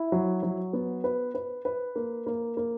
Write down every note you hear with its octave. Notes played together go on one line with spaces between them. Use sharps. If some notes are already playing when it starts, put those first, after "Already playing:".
Already playing: E4
F#3
F#3
B3
B4
B4
B4
A#3
A#3
A#3